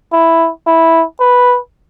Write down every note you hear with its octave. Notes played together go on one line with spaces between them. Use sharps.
E4
E4
B4